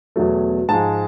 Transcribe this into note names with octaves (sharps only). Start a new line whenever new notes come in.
E2 B2 F#3 A3
G#2 F3 G#3 A5